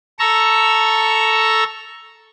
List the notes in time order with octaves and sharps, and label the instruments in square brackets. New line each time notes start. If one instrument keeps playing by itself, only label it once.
[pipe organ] A4 A#5 C#6 E6